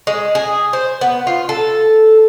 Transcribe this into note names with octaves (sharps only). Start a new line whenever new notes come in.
G#3
G#4
C5
B3
F4
A4